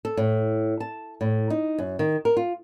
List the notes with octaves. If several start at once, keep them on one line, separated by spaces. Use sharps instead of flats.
A4
A2
A5
A2
D#4
F#2
D#3
A#4
F4